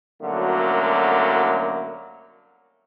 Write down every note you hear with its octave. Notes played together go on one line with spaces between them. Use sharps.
C2 F#2 D3 F#3 A3 A#3